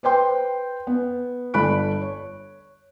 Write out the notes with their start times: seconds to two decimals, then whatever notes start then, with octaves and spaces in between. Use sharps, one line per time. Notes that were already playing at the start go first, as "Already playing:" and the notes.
0.03 B4 C5 G5 C6
0.87 B3
1.54 G1 A4 B5 F#6 D7
2.01 C#5